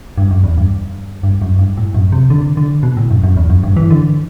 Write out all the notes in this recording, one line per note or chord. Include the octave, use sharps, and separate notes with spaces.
G2
F#2
E2
G2
G2
F#2
G2
A2
F#2
C3
D3
D3
B2
A2
F#2
F#2
E2
F#2
G2
E3
D3